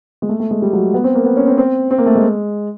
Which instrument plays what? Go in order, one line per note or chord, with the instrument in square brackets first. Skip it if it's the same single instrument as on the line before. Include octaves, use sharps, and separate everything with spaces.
[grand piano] G#3
A3
A3
G#3
G3
F#3
B3
C4
A#3
B3
C#4
C4
C4
C4
A#3
A3
G#3